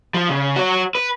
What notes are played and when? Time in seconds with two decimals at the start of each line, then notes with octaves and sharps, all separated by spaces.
0.15 F3
0.29 C#3
0.56 F#4 C#5
0.95 B4